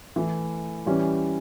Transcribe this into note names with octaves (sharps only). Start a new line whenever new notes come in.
E3 A3 E4
E3 G3 C#4